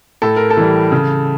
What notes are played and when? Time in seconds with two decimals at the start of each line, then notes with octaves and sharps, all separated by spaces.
0.22 A2 A4
0.36 A#4
0.50 A4
0.57 E3 G3
0.92 C#3